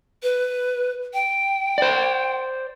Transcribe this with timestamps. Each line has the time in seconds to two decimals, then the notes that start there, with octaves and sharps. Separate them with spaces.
0.23 B4
1.14 G5
1.78 C5 D5